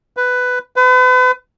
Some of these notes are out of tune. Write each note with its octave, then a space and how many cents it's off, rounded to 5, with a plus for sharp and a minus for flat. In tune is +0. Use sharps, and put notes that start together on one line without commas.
B4 +10
B4 +40